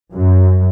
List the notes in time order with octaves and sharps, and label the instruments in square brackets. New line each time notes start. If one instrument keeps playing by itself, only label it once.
[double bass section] F#2